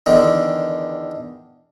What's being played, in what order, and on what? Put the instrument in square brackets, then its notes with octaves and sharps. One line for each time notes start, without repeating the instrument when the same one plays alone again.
[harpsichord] E2 D3 D#3